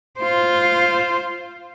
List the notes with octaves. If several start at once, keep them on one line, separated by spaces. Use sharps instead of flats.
F4 C5